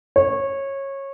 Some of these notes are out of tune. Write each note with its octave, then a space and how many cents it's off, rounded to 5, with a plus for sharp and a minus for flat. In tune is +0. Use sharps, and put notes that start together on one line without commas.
C#5 -20